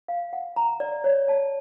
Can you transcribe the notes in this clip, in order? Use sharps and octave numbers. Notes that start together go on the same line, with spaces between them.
F5
F#5
A#5
D5
C#5
A5